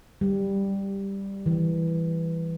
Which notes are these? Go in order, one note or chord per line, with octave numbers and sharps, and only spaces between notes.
G3
E3